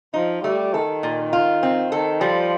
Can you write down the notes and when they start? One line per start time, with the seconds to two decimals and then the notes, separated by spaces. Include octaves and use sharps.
0.14 F3 D#4
0.44 G3 A3
0.74 D#3 A4
1.03 A#2
1.33 F4
1.63 C4
1.91 D#3 A4
2.21 F3 G3